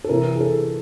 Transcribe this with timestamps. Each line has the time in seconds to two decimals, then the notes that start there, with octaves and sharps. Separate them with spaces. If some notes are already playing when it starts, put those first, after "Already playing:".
0.04 A4
0.09 C3 E3 A#4
0.35 G#4
0.41 A4